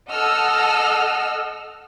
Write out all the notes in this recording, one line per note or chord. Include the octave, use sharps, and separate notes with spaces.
A4 D#5 F#5 E6 F6